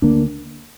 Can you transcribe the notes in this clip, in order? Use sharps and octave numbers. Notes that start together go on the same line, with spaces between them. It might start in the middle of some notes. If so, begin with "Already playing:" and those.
D2 D3 A#3 D4